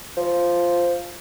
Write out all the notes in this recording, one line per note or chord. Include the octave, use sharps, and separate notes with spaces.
F3